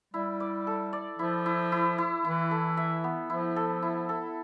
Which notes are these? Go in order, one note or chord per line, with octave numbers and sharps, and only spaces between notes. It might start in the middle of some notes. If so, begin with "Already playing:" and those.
G3 E4
D5
A4
D5
F3 E4
E4
E4
E4
E3 E4
A4
E5
B3
F3 E4
A4
E4
A4